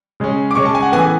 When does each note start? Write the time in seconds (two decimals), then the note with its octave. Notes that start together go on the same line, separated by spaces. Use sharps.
0.20 C#3 G#3 C#4
0.51 D6
0.55 C#3 G#3 C#4 C#6
0.65 A5
0.75 G#5
0.83 F#5
0.92 A2 E3 B3 G#5